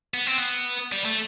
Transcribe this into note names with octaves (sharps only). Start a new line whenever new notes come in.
B3
C4
B3
G3
A3